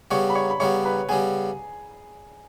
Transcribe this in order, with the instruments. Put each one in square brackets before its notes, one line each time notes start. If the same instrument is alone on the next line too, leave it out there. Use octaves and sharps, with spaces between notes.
[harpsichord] C#3 G3 B3 [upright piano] C#5 C#6
[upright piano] B5
C#5 C#6
B5
[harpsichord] C#3 G3 B3 [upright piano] C#5 C#6
[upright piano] B4 B5
[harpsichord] B3 [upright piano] G#4 G#5
[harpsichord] C#3 G3